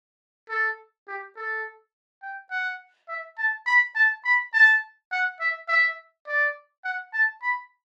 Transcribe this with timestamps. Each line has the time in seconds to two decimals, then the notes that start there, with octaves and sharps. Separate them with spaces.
0.49 A4
1.07 G4
1.36 A4
2.22 G5
2.51 F#5
3.09 E5
3.38 A5
3.66 B5
3.95 A5
4.25 B5
4.53 A5
5.12 F#5
5.40 E5
5.69 E5
6.27 D5
6.84 F#5
7.13 A5
7.42 B5